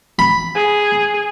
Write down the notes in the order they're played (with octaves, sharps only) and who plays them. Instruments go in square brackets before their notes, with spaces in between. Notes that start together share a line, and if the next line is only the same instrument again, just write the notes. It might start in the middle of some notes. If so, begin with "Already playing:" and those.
[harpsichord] B5
[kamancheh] G#4